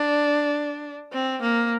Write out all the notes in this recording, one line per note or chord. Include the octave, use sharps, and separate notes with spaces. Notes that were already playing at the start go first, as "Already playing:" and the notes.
Already playing: D4
C4
A#3